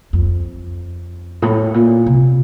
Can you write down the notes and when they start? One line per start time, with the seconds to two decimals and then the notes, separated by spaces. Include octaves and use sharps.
0.13 F2
1.42 A2
1.74 A#2
2.06 C3